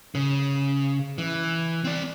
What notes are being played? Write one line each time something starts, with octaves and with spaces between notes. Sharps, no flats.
C#3
E3
C4 D5